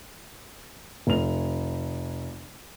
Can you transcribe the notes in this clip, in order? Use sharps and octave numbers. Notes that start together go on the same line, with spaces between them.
F1 F7